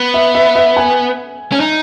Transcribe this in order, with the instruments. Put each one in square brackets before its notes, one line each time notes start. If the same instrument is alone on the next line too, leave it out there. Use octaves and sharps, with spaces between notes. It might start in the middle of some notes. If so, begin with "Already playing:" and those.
Already playing: [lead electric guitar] B3
[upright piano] E5
E5
E5
G#5
[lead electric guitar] C#4
D#4